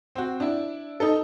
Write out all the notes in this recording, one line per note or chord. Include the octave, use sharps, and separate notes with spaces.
C4 F#4
D4 E4
D#4 A4